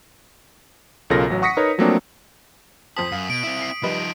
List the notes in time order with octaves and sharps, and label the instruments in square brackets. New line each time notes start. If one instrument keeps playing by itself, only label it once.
[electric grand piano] B1 C#3 F4 A4 A#4 A#6
A1 F#3
F#5 C#6 D#6 A#6 B6 C#7
D#4 A#4 B4 C#5
F3 F#3 A3 A#3 C4 D4
[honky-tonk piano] F2 C5 A5 [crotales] D#6 B6
[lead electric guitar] F#2 [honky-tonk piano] F5
[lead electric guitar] B2 [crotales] D7
[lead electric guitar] C4 E4
[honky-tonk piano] C7
[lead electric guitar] F3 D#4 [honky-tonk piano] G3 B4 D#5